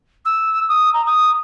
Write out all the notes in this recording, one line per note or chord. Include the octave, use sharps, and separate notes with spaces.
E6
D#6
A#5
D#6